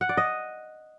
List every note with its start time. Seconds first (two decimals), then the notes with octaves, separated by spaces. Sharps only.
0.01 F#5
0.09 D5
0.17 D#5